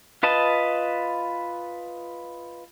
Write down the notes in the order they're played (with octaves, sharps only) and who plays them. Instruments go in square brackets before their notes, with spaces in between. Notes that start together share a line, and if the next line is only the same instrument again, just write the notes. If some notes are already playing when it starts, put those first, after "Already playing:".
[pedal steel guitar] F4 B4 D#5 A5